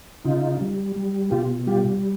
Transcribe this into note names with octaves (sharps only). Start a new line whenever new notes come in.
C#3 D#4 F4
G3
G3
B2 F4 G4
G3 F4 G4